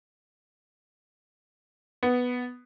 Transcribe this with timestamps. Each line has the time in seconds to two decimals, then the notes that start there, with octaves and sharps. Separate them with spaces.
2.03 B3